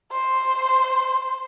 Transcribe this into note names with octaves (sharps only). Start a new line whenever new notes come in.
C5